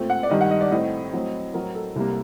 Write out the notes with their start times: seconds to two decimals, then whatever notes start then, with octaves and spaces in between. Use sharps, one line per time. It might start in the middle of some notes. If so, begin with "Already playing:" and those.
Already playing: A#2 A3 C4
0.10 F#5
0.23 D5
0.30 G2 D#3 G3 D#5
0.41 F#5
0.51 D#5
0.61 D5
0.71 A2 A3 C4 D#5
1.13 A2 F#3 C4
1.54 A2 F#3 C4 A#4
1.75 A4
1.96 C2 C3 G3 A#3